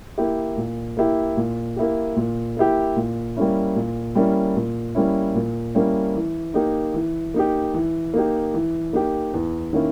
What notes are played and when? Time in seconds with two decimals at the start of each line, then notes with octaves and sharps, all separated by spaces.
0.18 A#3 E4 G4
0.57 A#2
0.97 A#3 E4 G4
1.37 A#2
1.76 A#3 E4 G4
2.16 A#2
2.57 A#3 E4 G4
2.96 A#2
3.36 G3 A#3 C#4 E4
3.76 A#2
4.15 G3 A#3 C#4 E4
4.56 A#2
4.95 G3 A#3 C#4 E4
5.35 A#2
5.75 G3 A#3 C#4 E4
6.15 E3
6.54 A#3 D#4 G4
6.94 E3
7.34 A#3 D#4 G4
7.74 E3
8.14 A#3 D#4 G4
8.54 E3
8.93 A#3 D#4 G4
9.33 E2
9.73 D#3 A#3 C#4 E4